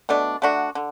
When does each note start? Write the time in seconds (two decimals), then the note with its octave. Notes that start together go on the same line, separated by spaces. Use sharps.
0.09 B2 A3 D4
0.42 D3 A3 D4 F#4
0.75 D3